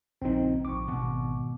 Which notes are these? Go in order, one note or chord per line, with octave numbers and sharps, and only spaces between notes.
A#1 A#2 C#3 C4 D#4
A#1 C#6 D6
G#1 B2